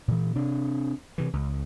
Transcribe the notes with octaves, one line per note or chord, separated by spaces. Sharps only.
A#2 E3
C3 D4
C3 E3
C#2